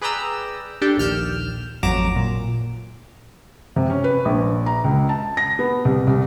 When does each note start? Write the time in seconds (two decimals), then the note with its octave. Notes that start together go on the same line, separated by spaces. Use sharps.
0.01 G#4 B4 D5 G5 A#5 E6
0.82 D4 G4 A4 G5
0.97 A#1 D#2 F6 G6 E7
1.83 A1 F2 F#3 A#5 D6 E7
2.16 A#2
3.76 C3
3.90 C#4
4.04 B4
4.25 A#1
4.66 A#5
4.84 C#2
5.09 A5
5.37 A#6
5.59 B3
5.85 C2
6.07 C2